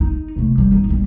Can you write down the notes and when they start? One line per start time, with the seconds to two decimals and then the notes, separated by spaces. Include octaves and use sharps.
0.01 D#4
0.36 C3 A3
0.58 G3
0.72 A1 D#4
0.89 A1 G3